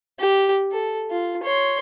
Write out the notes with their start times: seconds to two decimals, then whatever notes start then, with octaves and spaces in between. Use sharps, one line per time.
0.19 G4
0.71 A4
1.10 F4
1.43 C#5 C6